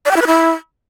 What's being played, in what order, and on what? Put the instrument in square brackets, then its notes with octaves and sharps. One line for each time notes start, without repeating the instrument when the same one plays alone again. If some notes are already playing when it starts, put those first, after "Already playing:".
[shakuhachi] D5
G5
E4
B4
E4